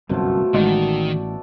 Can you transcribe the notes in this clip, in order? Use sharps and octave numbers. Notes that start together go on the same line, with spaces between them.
G1 C2 F#2 B2 F3 A3
A1 D#3 G#3 A4 D5 F#5